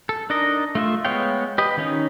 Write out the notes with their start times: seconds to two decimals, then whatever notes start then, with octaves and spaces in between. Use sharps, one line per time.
0.09 A4
0.30 D4 D#4 A#4 D#5
0.75 A3 F4 E5
1.05 G#3 B3 C#5 F5 G5
1.58 G4 B4 D#5
1.77 D#3 C#4 D#4